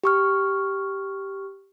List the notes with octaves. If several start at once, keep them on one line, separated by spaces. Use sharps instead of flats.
G4 C#6 F6